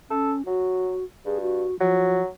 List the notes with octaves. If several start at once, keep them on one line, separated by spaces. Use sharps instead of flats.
C#4 A4
F#3 F#4
G2 G#4
F#4
F3 F#3